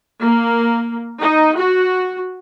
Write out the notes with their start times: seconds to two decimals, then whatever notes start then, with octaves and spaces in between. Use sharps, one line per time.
0.22 A#3
1.19 D#4
1.57 F#4